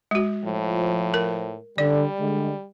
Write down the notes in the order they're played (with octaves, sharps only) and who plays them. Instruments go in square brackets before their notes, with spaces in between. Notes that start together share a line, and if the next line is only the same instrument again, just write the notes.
[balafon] G#3 F#4
[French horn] A2 [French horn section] F3
[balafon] A#4
[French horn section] D3 [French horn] G3 [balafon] D5
[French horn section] D3 G#3